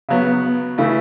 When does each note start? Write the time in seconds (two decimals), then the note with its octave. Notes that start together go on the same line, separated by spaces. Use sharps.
0.09 C#3 F#3 B3
0.78 C#3 E3 A3 E4